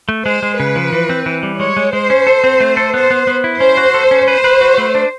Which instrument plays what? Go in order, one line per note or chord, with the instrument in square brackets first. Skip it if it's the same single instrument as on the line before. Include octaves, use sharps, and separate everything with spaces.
[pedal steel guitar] A3
[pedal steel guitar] G#3 [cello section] C5
[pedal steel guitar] G#3
[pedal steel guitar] C#3 [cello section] B4
[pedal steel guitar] F3
E3
C4
E3
G3
[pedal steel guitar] G#3 [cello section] C#5
[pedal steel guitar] G#3
[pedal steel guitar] G#3 [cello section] C5
[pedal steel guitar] C#4
A4
C4
A3
A4
[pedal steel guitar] B3 [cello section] C5
[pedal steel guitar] B3
B3
E4
[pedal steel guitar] C#4 [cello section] C5
[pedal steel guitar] F#4
A4
C#4
[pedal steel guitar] B4 [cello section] C5
[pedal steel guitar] B4
F#4
A3
D4